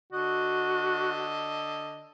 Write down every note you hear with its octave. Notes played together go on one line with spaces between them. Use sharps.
D3 F#4 D#5